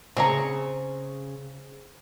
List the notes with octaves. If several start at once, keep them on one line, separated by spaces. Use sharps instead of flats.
C#3 C4 G#4 C#5 D#5 A#5 C#6